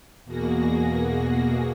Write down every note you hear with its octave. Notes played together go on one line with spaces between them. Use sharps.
E2 B2 A#3 F#4 G#4 A#6